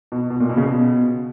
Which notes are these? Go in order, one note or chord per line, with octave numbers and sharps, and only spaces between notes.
B2
B2
A#2
B2
C#3
B2